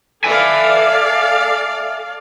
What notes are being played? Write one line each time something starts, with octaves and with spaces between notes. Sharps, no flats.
A4 D5 E5 F5 G#5